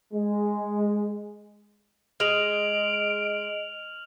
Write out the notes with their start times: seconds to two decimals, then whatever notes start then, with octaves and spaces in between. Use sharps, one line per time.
0.13 G#3
2.20 G#3 D#5 F6 D7 F7 F#7